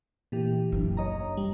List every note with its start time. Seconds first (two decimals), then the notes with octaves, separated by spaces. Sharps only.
0.32 A#2 E3 G4
0.72 F#1 D4
0.97 C#5 D#5 A#5
1.37 G3